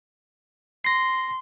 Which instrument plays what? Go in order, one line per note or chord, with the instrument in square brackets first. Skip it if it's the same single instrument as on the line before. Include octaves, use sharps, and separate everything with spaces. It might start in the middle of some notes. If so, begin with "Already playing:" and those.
[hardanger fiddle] C6 [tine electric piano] A#6 C7